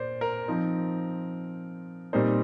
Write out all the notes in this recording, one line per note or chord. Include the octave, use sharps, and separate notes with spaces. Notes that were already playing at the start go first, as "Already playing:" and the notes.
Already playing: A#2 C5 D5
A#4
F3 C4 D#4
A#2 G3 C4 D#4 C5